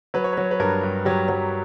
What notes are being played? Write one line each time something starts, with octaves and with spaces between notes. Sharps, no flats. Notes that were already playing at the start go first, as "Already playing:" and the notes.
F#3 B4
C#5
B4
F#3
B4
G2 A#4
G2
F#3 G4
F#3